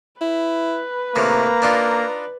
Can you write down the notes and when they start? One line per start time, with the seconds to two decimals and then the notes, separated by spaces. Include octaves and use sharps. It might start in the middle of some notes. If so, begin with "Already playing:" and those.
0.21 E4 B4
1.16 A2 C3 D#3 A#3 A#5
1.62 D4 D#4 F4